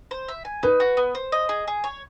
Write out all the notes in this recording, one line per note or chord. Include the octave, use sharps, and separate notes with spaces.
C5
E5
G#5
D#4 B4
F#4
B3
C5
D#5
G#4
G#4
C#5